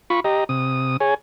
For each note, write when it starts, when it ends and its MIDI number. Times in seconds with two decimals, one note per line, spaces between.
0.10 0.20 65
0.10 0.20 83
0.10 0.20 85
0.24 0.44 67
0.24 0.44 75
0.24 0.44 82
0.49 0.97 48
0.49 0.97 87
1.00 1.14 68
1.00 1.14 73
1.00 1.14 80